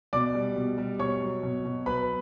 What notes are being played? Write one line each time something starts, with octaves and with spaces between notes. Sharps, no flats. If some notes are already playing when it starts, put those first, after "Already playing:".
B2 D5 D6
G3
B2
G3
B2 C#5 C#6
F#3
B2
B2
F#3 B4 B5